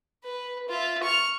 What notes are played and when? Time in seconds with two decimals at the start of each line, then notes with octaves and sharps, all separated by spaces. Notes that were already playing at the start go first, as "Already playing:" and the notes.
0.24 B4
0.69 F4 E5
1.03 C#6 F6